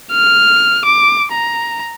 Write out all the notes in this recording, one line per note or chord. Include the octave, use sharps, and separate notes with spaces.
F6
D6
A#5